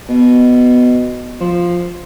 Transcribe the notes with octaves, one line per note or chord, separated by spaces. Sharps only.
B2
F3